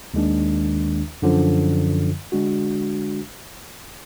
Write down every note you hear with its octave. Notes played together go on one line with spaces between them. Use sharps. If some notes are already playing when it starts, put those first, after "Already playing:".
D#2 D#3 G#3 D4
F#2 D3 F3
D3 G#3 D4 F#4